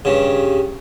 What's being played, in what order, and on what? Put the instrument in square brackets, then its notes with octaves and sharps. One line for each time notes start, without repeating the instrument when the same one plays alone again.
[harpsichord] G2 C#3